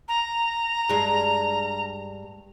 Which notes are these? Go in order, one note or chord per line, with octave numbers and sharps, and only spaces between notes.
A#5
G2 G#3